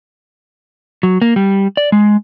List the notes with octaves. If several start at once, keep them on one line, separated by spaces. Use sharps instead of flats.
F#3
A#3
G3
D5
G#3